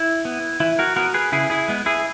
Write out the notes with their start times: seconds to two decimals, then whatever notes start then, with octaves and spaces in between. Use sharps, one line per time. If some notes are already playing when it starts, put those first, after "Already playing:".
Already playing: E4
0.25 B3
0.60 E3 E4
0.79 F#4 A#4
0.96 B3 F#4 A#4
1.14 G#4 B4
1.32 C#3 E4 G#4
1.50 E4 G#4
1.68 G#3 B3
1.86 E4 G#4